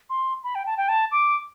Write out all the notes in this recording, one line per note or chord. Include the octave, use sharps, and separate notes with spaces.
C6
B5
G5
A5
G5
A5
D6